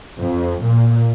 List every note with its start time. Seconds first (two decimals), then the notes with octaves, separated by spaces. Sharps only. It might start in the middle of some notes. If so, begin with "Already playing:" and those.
0.21 F2
0.64 A#2